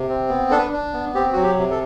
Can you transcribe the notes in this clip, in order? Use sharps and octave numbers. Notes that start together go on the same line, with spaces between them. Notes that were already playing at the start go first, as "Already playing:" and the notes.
Already playing: C3
C4
B3
D4 A4
B4
D4
B3
C4 G4
F#3 F#4
G4
C3
A4